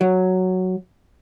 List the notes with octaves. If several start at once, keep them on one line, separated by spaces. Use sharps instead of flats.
F#3